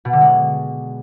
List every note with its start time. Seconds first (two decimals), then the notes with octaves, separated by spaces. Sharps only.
0.05 B2
0.13 D3
0.21 G#3